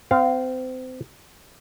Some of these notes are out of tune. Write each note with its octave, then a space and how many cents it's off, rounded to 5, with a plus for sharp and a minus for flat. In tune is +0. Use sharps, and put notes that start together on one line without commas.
C4 -30 F5 +0